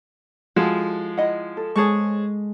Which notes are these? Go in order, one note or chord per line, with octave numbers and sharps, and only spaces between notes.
F3 G#3 E4 F#4 A4
E4 D#5 F#5
A4
G#3 G#4 C5 C#5 A5 C#6